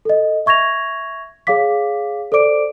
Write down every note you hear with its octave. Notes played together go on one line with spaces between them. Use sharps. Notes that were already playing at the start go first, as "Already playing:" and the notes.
A4 D#5
E5 C#6 G#6 A#6 F7
G#4 C#5 F5 D6 B6
A4 C5 D5 D6 D7